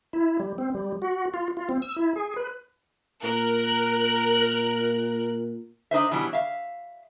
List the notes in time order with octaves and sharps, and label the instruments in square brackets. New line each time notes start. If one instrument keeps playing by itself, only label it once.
[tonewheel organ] E4
G3
C4
G3
F#4
F4
F4
C4
E6
E4
G#4
B4
[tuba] A#2 [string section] A#4 F#6
[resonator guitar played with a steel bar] D4 D#4 C5 E5
B2 E3 F#3 G3
E5 F5